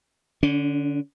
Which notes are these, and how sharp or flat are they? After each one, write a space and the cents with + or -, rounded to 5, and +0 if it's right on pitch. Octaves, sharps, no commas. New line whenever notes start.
D3 +0 C#4 +45